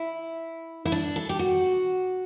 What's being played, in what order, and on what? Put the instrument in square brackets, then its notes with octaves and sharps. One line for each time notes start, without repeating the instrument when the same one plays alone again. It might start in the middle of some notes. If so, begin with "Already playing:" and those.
Already playing: [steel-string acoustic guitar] E4
E4
D4
A4
G4
F#4